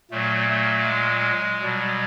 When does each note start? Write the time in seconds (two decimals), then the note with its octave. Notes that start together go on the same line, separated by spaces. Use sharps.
0.11 A#2 F#3 A3
0.49 A3
0.87 G#3
1.62 B2 F#3 G3